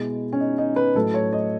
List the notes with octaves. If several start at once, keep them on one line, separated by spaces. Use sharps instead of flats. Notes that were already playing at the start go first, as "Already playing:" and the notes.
Already playing: B2 G#3 E4
C#4
D#4
D#4
B4
A2 F#3 A4
C#5
D#5